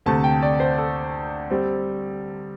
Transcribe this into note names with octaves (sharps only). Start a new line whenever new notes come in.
D2 C3 A3 A5
G5
D5
C5
A4
G3 C4